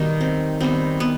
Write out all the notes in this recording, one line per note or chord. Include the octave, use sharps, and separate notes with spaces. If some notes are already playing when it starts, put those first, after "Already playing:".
Already playing: B2 D#3 G3 B3 D#4
C4
D#3 G3 B3 C4
B3